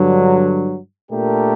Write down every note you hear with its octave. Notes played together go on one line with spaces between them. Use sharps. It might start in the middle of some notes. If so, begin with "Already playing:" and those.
Already playing: G2 D3 F#3
A#2 A3 D4 G4 A#4